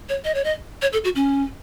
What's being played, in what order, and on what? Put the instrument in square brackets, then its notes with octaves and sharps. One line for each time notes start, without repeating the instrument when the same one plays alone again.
[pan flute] C#5
D#5
C#5
D#5
C#5
A4
F#4
C#4